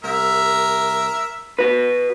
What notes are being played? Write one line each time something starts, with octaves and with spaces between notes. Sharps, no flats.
C2 A#4 E5
F#4 B4